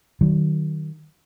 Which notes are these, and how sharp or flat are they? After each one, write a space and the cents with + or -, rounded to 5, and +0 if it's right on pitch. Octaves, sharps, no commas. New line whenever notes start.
D#3 -10 F#3 +35